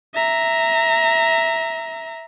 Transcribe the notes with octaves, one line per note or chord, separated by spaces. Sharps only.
E5 A#5